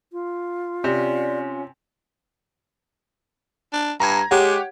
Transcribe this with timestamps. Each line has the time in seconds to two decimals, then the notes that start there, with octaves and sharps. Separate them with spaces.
0.13 F4
0.84 C3 C#4 D5
3.73 D4
4.00 G2 A#5 G#6
4.31 G#3 G4 C#5 F#5